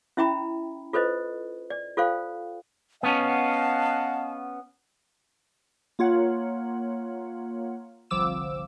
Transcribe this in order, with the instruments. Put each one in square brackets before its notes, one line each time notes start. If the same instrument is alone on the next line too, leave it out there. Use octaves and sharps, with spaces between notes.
[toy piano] C#4 E4 E5 G5 A#5 B5
F4 A4 B4 C5 D#5
D5
F4 A4 C5 F5 G5
[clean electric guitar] B3 C#4 [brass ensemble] D#5 F5 F#5 [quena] A5
[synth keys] A#3 F4 C#5 F#5
G1 C2 F3 D6 E6 E7